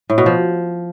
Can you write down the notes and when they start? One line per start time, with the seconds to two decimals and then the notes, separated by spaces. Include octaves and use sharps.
0.10 A2
0.18 B2
0.26 F3